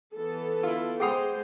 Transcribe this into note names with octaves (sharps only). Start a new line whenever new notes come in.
E3 B3 A4
E4 F4
G#3 G#4 C5 F#5 G5 B5 D#6